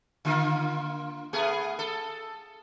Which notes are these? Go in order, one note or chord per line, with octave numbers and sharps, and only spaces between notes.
D3 A#3 F4
A3 B3 G#4
A4